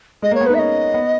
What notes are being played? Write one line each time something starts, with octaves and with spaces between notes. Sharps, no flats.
G#3 D#5
A#3 C#5
B3
D#4 B4
E5
C#4 D#5
B3